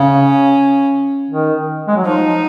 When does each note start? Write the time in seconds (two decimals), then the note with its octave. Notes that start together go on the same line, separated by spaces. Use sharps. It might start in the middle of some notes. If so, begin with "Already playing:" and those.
Already playing: C#3 C#4
1.31 D#3
1.88 G#3
1.96 F#3
2.05 F3 D#4